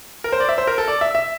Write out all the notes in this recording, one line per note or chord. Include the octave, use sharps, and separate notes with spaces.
A#4
C5
D5
E5
C5
A#4
A4
D5
E5
E5